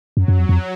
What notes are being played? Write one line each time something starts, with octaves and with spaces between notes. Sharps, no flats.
F#2 F#3
F#2
F2
F2